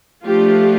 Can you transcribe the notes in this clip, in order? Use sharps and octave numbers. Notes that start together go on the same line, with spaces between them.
F3 A3 D4 F4 G4